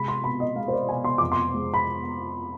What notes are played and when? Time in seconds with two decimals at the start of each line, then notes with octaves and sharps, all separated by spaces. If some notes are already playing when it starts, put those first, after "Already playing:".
Already playing: C3 G#3 B5
0.08 C6
0.24 B2 B5
0.40 D#5
0.56 G#3 F5
0.68 C5
0.73 D5
0.88 B2 G#5
1.04 C6
1.18 F2 D6
1.32 C6
1.54 G#3
1.74 B5